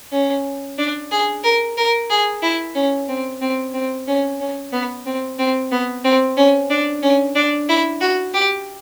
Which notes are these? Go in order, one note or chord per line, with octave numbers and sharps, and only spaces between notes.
C#4
D4
G#4
A#4
A#4
G#4
E4
C#4
C4
C4
C4
C#4
C#4
B3
C4
C4
B3
C4
C#4
D4
C#4
D4
E4
F#4
G4